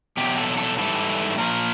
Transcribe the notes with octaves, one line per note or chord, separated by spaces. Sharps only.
E2 B2 F#3 G4
A4
A4
G#2 E3 G3 A4
A#2 F3 A#4